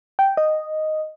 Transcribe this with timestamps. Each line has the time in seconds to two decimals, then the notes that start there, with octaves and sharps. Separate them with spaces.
0.19 G5
0.37 D#5